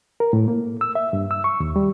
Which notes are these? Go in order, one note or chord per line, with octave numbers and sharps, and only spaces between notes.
A#4
A2
A#3
E6
E5
G2
E6
C#6
D#2
G3